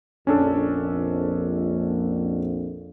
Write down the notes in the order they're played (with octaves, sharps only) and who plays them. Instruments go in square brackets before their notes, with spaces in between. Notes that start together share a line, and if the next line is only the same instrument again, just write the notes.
[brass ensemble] A#1 F2 [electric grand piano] C#4 D4 A4